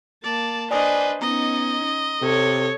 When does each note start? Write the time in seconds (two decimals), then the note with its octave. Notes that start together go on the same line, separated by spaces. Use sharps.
0.24 A#3 D5 A5
0.71 D4 B4 C5 D5 D#5 G#5 D#6
1.22 B3 C#4 D#4 D#5 A#5
2.22 C3 A4 C#5